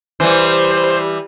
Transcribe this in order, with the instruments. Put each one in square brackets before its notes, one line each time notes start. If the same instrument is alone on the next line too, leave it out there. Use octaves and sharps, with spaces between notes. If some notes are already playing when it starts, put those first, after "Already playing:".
[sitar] E3 G3 [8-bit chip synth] C5